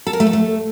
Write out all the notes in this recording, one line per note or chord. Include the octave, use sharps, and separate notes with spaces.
A4
A#4
A3
A4
A3